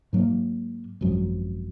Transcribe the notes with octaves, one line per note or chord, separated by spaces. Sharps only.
G#2 F#3 A#3
G#1 F#2 F3